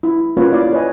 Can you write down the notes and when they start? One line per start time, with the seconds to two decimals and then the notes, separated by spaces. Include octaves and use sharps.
0.03 E4
0.37 A#3 C#4 F4 F#4 B4 C#5
0.52 E4 D5 F5
0.72 B4 C#5 D#5 G#5